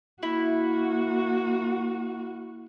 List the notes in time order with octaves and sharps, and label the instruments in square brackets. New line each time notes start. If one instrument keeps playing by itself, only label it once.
[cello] A#3 F#4 [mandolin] E4